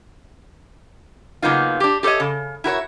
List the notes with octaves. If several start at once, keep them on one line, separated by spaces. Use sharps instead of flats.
C#3 F#3 A#3 B3 D#4 F4
D4 G4
G4 A4 C5 C#5 D#5
C#3
E4 F#4 A#4 C#5